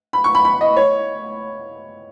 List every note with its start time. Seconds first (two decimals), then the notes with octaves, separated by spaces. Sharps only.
0.13 B5
0.24 C#6
0.35 B5
0.45 B5
0.61 D#5
0.77 C#5